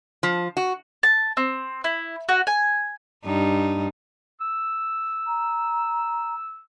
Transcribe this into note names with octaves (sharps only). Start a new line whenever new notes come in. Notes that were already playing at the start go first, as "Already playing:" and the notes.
F3
F#4
A5
C4
E4
F#4
G#5
G2 D#4
E6
A#5